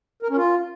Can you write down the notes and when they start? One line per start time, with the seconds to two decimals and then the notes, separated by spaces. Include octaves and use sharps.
0.23 A#4
0.30 C#4
0.37 F4